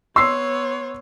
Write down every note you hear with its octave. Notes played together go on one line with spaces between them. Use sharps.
B3 C#5 C6 E6 C7